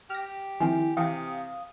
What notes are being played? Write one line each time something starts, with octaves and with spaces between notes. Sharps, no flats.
G4 F6 A#6
D#3 F3 C4 E4 G#5
C3 E3 F5 G5 D#6